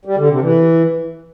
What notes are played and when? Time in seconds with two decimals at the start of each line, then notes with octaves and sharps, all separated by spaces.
0.05 G3
0.17 D3
0.29 C3
0.41 E3